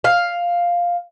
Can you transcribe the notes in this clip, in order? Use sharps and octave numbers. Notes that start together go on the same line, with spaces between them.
F5